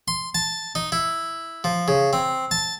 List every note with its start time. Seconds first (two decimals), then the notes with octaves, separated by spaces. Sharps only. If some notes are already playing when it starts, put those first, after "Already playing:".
0.08 C6
0.35 A5
0.75 D#4
0.92 E4
1.64 F3
1.88 C#3
2.13 C4
2.51 A5